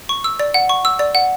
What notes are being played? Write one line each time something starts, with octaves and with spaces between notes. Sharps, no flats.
C#6
E6
D5
F#5
C#6
E6
D5
F#5